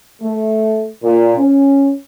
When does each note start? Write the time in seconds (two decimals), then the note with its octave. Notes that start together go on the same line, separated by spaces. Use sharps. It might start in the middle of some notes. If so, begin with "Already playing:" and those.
0.21 A3
1.03 A#2
1.37 C#4